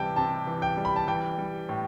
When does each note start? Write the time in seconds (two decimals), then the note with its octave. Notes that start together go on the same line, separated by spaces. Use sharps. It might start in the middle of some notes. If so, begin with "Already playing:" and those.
Already playing: C3 E3 G3 G5 A5
0.16 C3 A5
0.47 E3
0.62 G5
0.77 G3
0.85 B5
0.96 A5
1.07 E3 G5
1.38 G3
1.69 A2